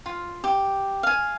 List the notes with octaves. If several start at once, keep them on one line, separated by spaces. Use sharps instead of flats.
F4
G4
F5 G#5